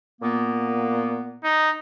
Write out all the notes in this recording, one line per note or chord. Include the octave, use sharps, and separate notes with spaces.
A#2 A#3 B3
D#4